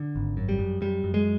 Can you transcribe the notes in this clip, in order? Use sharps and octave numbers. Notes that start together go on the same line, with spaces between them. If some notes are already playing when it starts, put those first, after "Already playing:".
Already playing: D3
G#1
F#2
G3
F#2
F#2 G3
F#2
G#3